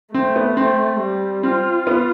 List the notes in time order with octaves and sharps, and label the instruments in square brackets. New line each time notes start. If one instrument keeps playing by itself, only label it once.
[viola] A3 [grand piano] C4
[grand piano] B3
C4
[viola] G3
[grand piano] C4 [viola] F4
[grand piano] B3